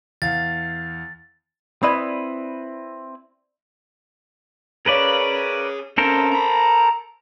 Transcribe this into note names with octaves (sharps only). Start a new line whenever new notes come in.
E2 F5 A6
C4 E4 B4 D5 B5 D#6
G#4 A#4 B4 C#5 D5
C3 C#4 A4 A#4 C5
A#5 B5